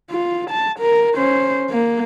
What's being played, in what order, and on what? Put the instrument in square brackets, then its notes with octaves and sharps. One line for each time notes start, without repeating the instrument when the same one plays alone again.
[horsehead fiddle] F4
A5
A#4
C#4 C5
A#3